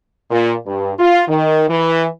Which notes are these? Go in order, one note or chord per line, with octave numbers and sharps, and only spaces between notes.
A#2
G2
F4
D#3
E3